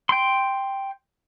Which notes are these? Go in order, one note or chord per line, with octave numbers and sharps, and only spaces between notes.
G5 C6